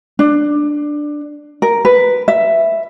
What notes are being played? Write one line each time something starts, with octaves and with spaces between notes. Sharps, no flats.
D4
A#4
B4
E5